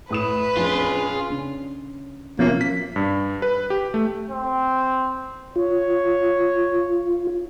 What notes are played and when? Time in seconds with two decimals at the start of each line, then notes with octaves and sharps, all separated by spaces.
0.10 A2 B4 D#6 E7
0.57 A#1 F2 C#4 F4 G#4
1.31 C#3 C#4 D4
2.39 B2 F3 A#3 C4 C#4 E5
2.61 B6
2.96 G2
3.42 B4
3.70 G4
3.94 A3
4.30 C4
5.56 F4 C#5